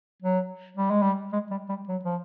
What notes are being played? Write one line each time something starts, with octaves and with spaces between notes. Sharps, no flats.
F#3
G3
G#3
G3
G#3
G3
G3
F#3
F3